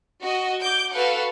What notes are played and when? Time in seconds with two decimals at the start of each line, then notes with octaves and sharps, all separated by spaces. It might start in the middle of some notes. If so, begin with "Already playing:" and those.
0.22 F#4 D#5
0.62 D6 G6 D7
0.93 F#4 A4 B4 F5 F#5